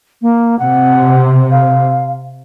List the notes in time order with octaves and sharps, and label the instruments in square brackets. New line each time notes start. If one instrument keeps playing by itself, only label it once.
[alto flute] A#3
[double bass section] C3 [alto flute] F#5
[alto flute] F5